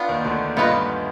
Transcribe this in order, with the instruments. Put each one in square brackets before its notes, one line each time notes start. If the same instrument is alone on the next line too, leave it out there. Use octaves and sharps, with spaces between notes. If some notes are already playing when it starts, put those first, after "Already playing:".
Already playing: [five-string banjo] B3 D4 F4
[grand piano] D#2 D#3
D2 D3
[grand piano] G2 [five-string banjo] B3 F4 B4 D#5